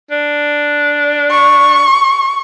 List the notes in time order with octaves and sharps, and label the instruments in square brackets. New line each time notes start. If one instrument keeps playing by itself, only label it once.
[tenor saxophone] D4
[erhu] C#6